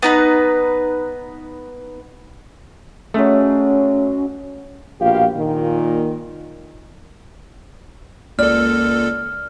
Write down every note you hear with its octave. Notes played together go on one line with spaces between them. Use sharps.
B3 D#4 B4
F#3 G#3 A3 C#4
A#1 B2 F4 G4 F5
A#2 D#3
C#2 A#3 A4 D5 F6